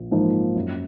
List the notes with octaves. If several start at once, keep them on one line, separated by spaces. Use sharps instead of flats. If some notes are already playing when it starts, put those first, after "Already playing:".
Already playing: A#1 A#3
G#2 F3 A#3 D#4
F#2